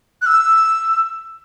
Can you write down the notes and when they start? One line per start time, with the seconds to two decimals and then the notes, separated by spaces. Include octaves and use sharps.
0.22 F#6
0.26 E6